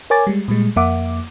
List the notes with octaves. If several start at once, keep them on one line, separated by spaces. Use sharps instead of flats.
A#4 C#5 G#5 D6 A6
G3 G#3
A#2 G3 G#3
F2 A#3 E5 F#5 D6